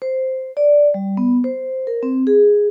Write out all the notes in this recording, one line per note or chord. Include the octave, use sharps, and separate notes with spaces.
C5
D5
G3
B3
C5
A#4
C4
G#4